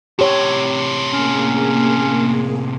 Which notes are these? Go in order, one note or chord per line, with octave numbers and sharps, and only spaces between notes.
A2 C3 G4 C#5
A#3 C#4 G#4